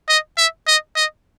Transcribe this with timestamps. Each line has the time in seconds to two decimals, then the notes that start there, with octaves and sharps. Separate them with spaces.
0.09 D#5
0.38 E5
0.67 D#5
0.96 D#5